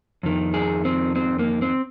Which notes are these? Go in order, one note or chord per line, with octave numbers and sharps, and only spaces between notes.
F2 D#3
G#4
C4
C4
A#3
C4